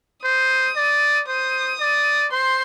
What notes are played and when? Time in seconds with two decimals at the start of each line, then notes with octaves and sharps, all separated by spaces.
0.24 C5 D#6
0.76 D5
1.28 C5 D#6
1.80 D5
2.32 C5 C6